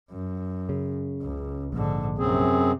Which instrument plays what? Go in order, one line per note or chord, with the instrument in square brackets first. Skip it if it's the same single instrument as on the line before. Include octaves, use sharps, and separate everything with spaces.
[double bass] F#2
[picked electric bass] C#3
[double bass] C#2
[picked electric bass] A#1 [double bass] G#2 D3
[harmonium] F#2 C4 G#4 [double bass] C3